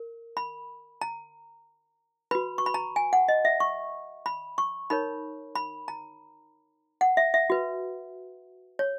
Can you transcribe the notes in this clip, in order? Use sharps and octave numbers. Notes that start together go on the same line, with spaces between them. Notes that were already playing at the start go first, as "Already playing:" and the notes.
Already playing: A#4
B5
A#5
F#4 B4 B5
C#6
B5
A#5
G#5
F#5
D#5
E5
C#6
B5
C#6
D#4 A#4 C#5 B5
B5
A#5
F#5
E5
E5
F#4 B4
C#5